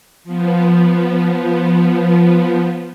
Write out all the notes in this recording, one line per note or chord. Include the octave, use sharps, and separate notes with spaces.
F3 B3